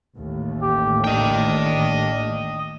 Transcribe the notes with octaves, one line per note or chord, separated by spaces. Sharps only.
A1 D#2 A2
G4
D4 D#5 G5